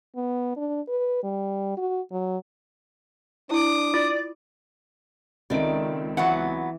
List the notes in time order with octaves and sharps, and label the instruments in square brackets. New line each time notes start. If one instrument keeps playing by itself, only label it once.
[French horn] B3
D4
B4
G3
F#4
F#3
[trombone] D4 [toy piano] E4 [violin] D6 D#6
[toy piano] F4 [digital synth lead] D5
[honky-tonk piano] C#2 C4 D7 [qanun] D#3 A3 D5
[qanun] E3 [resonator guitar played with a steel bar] F#3 B3 F#5